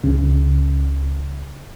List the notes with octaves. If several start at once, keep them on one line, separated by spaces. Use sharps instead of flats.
C#2 C#3